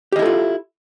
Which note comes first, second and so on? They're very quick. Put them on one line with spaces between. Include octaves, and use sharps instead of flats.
G4 D#5 E4 A4 F4